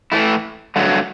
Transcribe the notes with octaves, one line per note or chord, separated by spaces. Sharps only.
A2 E3 A3 E4
G2 D3 F#3 A3